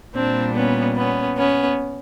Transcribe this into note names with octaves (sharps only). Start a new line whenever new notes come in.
A#2 G3 C4 D4
B3 C#4
B3 C#4
B3 C#4